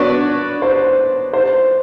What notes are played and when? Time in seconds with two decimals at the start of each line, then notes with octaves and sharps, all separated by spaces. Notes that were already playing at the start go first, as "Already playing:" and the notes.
Already playing: B3 D4 F#4 B4 C#5 D5
0.62 C5
1.33 C5